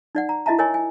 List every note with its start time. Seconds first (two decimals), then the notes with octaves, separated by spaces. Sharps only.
0.15 D#4 D5 F#5
0.29 A#5
0.46 E4 F#4 D#5 E5 A5 A#5
0.59 A#4 C#5 D#5 G#5 C#6
0.74 G#5